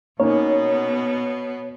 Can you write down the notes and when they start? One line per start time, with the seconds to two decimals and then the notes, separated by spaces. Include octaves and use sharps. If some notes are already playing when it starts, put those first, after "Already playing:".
0.20 B2 A#3 B3 C#4 D#4 C#5